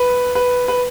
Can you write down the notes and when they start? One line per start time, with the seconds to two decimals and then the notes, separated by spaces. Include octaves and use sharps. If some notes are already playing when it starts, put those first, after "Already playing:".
Already playing: B4
0.35 B4
0.68 B4